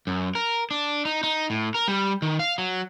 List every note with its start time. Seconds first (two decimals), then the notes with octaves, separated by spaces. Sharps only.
0.07 F#2
0.35 A#4
0.71 D4
1.05 D#4
1.23 D#4
1.50 A2
1.75 A#4
1.88 G3
2.22 D#3
2.39 F5
2.58 F#3